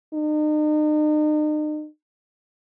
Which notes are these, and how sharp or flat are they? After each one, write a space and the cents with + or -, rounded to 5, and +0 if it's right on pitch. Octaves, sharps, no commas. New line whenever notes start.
D#4 -40